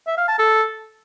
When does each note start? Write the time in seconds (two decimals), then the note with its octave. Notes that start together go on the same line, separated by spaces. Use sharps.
0.07 E5
0.18 F5
0.28 A5
0.39 A4